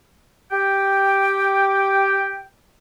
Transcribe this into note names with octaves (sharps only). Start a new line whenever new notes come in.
G4 G5